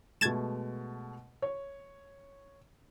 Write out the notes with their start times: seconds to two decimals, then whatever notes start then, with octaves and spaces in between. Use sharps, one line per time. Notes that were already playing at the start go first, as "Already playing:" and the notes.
0.21 B2 G#3 A3 G#6 A6 E7
1.42 C#5